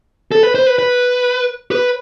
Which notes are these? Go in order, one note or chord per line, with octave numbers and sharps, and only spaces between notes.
A4
B4
C5
B4
B4
B4